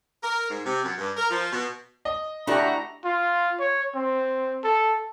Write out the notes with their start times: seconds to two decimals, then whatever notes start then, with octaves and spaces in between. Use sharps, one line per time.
0.23 A#4
0.50 G#2
0.66 C3
0.84 F#2
0.98 G2
1.17 A#4
1.30 F3
1.53 B2
2.05 D#5
2.47 A3 D4 E4 F#4 G4 A#5
3.05 F4
3.60 C#5
3.95 C4
4.64 A4